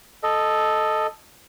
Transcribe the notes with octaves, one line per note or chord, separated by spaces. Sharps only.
A4 D#5